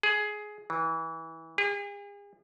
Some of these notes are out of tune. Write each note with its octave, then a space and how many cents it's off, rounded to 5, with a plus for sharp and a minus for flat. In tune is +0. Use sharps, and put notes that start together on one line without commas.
G#4 +15
E3 -20
G#4 -40